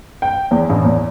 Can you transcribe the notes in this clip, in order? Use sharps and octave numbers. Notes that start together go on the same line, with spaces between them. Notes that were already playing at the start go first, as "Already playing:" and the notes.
G5
E2
A1
E2